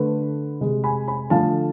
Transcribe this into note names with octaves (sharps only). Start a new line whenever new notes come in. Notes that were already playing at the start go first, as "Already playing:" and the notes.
Already playing: D3 A3 B4
C3 G#3
G#5 B5
G#5 B5
D3 F3 A3 F5 A5